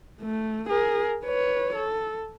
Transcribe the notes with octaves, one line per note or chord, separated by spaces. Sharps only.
A3
G#4 A#4
B4 C#5
A4